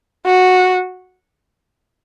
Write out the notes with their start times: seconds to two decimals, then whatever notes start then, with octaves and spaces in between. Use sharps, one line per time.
0.26 F#4